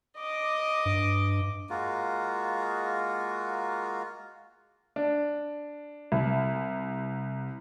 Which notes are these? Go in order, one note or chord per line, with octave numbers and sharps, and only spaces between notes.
D#5 D6
G2
G#3 A#3 F4 F#4
D4
C2